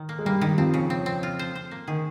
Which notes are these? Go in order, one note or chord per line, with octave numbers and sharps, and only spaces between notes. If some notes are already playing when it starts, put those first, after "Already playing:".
Already playing: D#3
A#3
G#3
G2 G3 A#3
G2 D#3 G3
F2 F3 C4
C#3
C4
C4
F4
C5
C5
A#3
D#3 G#4